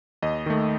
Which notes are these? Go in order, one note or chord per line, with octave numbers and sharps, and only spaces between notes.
D#2 D#5
D#3 A3